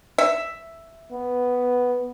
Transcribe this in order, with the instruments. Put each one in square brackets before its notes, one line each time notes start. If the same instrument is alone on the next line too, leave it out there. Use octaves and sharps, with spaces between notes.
[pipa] E5
[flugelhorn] B3